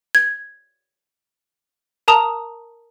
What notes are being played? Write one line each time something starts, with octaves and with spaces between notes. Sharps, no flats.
G#6
A#4 A5 A#5 D#6